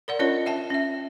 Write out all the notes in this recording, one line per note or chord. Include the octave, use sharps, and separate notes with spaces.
A#4 D5 F#5
C#4 D4 F4 A#4 C#5 D#5
E5 G5 A5
C#4 E5